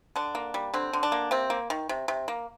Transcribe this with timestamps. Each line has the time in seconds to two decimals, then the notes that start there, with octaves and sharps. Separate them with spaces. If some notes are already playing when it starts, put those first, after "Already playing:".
0.16 D3 D4
0.35 A#3
0.54 G3
0.74 D3 C4
0.93 D3
1.03 D4
1.12 A#3
1.31 C3 C4
1.50 A#3
1.70 D#3
1.89 C3
2.08 C3
2.28 A#3